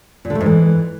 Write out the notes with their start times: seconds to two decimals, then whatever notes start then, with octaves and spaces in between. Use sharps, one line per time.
0.25 A#2
0.30 D3
0.35 A3
0.41 G#2
0.46 E3